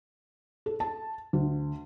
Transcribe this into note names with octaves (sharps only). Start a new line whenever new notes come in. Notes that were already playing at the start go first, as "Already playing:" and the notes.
A4
A5
D2